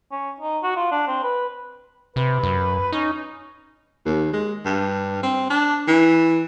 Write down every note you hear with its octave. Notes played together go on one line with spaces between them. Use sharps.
C#4
D#4
F#4
F4
D4
C4
B4
C3 B4
F#2
C#4 D#4
D#2
G#3
G2
C4
D4
E3